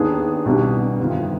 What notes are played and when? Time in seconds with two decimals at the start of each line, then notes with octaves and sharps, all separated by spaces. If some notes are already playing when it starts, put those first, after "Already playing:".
Already playing: D#2 D#3 B3 D4 G#4
0.46 C2 B2 B3 D4 G4
0.99 G1 F2 D#3 B3 F4